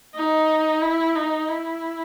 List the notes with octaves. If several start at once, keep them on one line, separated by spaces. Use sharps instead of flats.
D#4
E4
D#4
E4